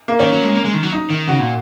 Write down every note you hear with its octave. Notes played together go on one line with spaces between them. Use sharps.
A#3
D#3 C#4
F#3
G#3
A#3
G#3
D#3
F#3
D#4
D#3
C#3 F#4
A#2